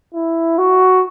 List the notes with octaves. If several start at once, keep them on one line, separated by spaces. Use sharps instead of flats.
E4
F#4